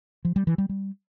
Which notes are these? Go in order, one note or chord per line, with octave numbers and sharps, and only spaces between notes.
F3
G3
E3
G3
G3